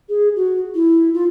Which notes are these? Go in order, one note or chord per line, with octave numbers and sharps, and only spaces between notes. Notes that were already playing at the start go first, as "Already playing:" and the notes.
G#4
F#4
E4
F4